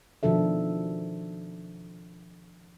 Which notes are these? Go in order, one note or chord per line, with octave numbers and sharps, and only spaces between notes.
B2 D#3 F3 D4 A4 E5